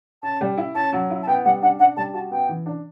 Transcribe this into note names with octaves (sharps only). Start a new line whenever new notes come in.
C#4 A5
G3
E4
C#4 A5
F#3
E4
A5
B3 G5
G3 F#5
D4 F#5
D4 F#5
G3 A5
F#4 A5
B3 G5
E3
D4